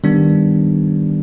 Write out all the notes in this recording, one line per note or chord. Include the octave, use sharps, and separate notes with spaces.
D#3 G3 B3 D4